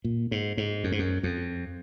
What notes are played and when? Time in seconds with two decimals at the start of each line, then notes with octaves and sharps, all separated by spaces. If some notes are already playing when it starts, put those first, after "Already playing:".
0.04 A#2
0.31 G#2
0.57 G#2
0.84 F#2
0.92 G#2
0.99 F#2
1.23 F2